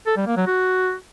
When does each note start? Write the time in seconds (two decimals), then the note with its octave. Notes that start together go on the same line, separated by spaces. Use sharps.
0.07 A4
0.17 G3
0.27 A#3
0.37 F#3
0.47 F#4